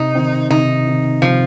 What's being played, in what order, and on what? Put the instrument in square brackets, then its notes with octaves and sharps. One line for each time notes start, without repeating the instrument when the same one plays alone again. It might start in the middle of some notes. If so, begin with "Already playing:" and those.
Already playing: [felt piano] C3 [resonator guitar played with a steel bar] D#4
[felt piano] D#3 C4
[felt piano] C3 [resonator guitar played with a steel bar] D#4
[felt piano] D#3 C4
[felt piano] C3 [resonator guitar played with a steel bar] F3